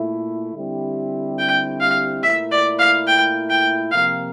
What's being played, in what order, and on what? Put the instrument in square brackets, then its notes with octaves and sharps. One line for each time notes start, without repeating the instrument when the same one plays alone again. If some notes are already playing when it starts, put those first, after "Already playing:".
Already playing: [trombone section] A#2 A3 E4
D3 G3 C4 E4 G4
[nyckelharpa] G5
F5
[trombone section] A#2 A3 E4 A#4 [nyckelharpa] E5
[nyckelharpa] D5
F5
G5
G5
[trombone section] C3 F3 A#3 F4 A#4 [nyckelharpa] F5